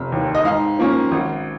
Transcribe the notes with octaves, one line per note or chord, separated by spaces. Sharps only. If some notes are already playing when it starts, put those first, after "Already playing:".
Already playing: F1
D#2 D#3
D#5
G#2 F5
F3 A#3 C#4
G#1